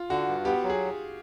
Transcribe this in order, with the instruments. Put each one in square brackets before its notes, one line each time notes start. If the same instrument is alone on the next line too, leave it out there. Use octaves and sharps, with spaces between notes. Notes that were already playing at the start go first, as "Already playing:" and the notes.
Already playing: [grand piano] F4
[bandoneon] D3 [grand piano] F#4
[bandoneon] G2
[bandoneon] B3 [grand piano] G4
[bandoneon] F#3
[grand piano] G#4